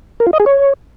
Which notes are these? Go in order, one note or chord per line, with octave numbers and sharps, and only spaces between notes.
A#4
F4
D#5
G#4
C#5